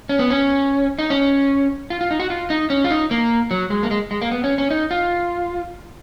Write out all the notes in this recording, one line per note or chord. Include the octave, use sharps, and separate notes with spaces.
C#4
B3
C#4
D#4
C#4
F4
F4
D#4
F#4
F4
D#4
C#4
F4
D#4
A#3
F#3
G#3
A#3
G#3
G#3
A#3
B3
C#4
C#4
D#4
F4